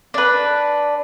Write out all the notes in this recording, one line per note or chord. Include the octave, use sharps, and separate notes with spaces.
D4 B4